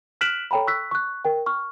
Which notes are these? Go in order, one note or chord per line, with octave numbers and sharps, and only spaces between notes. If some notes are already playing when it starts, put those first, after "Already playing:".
F6 F#6 B6 D7 E7 F#7
A4 C#5 G5 A#5 B5
C#6 E6 F#6 B6
C#6 F#6
A#4 G5
C#6 F6